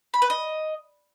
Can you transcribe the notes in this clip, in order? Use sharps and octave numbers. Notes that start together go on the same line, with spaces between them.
B5
B4
D#5